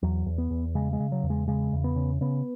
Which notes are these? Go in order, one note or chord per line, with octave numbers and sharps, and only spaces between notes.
E2 F#3
E2
B3
E2
C#3 G#3
G#3
C#3
F#3
E2
G#3
C#3 G#3
E2
B3
C#3
C#3 B3